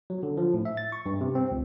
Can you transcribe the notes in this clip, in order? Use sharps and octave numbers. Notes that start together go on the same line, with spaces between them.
F#3
D3
F3
A2
E5
A6
C#6
G2
C3
C4
C#2